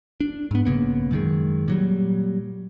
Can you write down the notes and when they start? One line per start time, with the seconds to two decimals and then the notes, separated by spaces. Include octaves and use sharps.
0.20 D4
0.51 G#2 B3
0.65 A#1 C#3 A#3 B3
1.11 F#2 D#3 G#3
1.68 A#2 F#3 G3